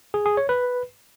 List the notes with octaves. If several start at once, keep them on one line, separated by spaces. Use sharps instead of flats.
G#4
G#4
C#5
B4